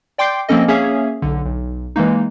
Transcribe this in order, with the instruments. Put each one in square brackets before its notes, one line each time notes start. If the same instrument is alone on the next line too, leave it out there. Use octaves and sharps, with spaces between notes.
[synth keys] D5 G5 C6 D6 G6 C7
F3 A#3 C4 C#4 A4 D#5
A#3 C#4 G#4 C#5 E5 F5
B1 D3
B1
E3 G#3 A#3 D#4